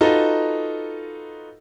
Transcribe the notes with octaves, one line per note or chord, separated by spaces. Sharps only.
D#4 F4 F#4 A4 B4 D#5